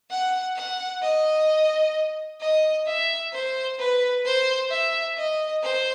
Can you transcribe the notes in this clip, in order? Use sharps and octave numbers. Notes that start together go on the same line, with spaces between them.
F#5
F#5
D#5
D#5
E5
C5
B4
C5
E5
D#5
C5